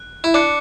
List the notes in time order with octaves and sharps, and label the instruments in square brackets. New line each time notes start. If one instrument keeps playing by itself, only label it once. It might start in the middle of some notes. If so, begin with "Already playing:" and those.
Already playing: [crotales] F#6
[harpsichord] E4
[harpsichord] D4 [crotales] D6 F#6 C#7